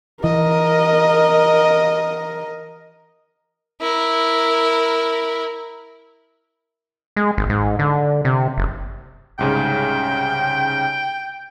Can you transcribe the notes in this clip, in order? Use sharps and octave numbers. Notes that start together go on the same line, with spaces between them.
E3 A#4 D#5
E4 A#4
G#3
G#1
G#2
D3
C3
F#1
C2 G#2 C#3 G5